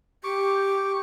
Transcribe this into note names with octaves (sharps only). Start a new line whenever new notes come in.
G4 C#6 D6